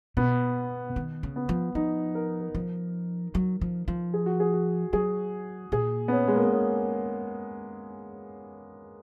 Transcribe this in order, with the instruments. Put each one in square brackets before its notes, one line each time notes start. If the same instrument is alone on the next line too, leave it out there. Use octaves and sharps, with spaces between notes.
[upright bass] B2 [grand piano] B3
[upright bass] D#3
C#3
[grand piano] B3
[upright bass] F3
[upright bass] F3 [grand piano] D#4
[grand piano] A#4
A#4
[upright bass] F3
F#3
F3
F3
[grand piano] G#4
F#4
G#4
F#4
[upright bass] F#3 [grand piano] G#4
[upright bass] A#2 [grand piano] G#4
[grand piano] B3
C#4
G#3
A#3
B3
C#4